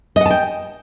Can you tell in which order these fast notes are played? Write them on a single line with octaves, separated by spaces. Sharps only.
D#5 F#5 A5 G5